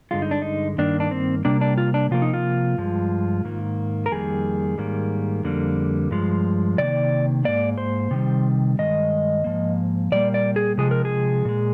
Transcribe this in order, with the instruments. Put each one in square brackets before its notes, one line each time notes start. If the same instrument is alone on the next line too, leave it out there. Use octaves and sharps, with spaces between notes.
[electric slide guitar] G2 D3 G#3 F4
D#4
D4
D#4
G2 D#3 A#3 D4
D4
C4
C3 G3 A#3 D4
D4
F4
D4
C3 F3 A#3 F4
D#4
F4
G2 F3 G#3
G#2 D#3 A#3
A#4
F2 D#3 G3 A#3 G#4
G#2 D#3 G3 A#3
F2 D3 G3 A#3
G2 F3 G#3
C3 D#3 A#3 D5
G#2 D#3 A#3 D5
C5
C3 D#3 G3
G2 D#3 G#3 D#5
G#2 F3 A#3
A#2 G3 A#3 D5
D5
G#4
C3 F3 G#3 G#4
A#4
G#4
A#2 G#3